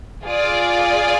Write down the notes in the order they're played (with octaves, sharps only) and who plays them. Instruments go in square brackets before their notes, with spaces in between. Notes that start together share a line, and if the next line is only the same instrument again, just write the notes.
[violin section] F4 G#4 D5